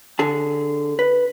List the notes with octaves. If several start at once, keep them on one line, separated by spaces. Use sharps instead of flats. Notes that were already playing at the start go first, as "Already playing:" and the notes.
D3 G#4 A5
B4